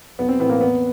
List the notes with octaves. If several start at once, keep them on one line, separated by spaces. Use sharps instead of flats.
B1 B3
C4
A2 E3 B3
A#3
E2 B3